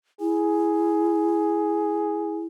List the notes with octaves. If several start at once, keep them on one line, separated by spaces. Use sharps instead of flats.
E4 G#4